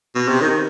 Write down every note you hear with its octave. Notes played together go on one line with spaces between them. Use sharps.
B2
C3
D#3